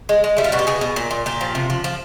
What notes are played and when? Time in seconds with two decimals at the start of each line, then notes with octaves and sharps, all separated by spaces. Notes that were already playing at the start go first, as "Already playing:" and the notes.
0.09 G#3
0.24 G#3
0.37 G3 E4
0.44 F4
0.52 B2 F#4
0.59 G4
0.67 B2 G#4
0.81 B2
0.96 A#2
1.11 A#2
1.26 A#2 G4
1.41 F3
1.55 C3
1.70 F3
1.84 F3